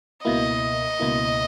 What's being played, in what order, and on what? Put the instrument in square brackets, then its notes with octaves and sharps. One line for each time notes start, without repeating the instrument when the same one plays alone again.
[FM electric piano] C#2 B2 A#3 E4 [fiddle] D#5
[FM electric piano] C#2 B2 A#3 E4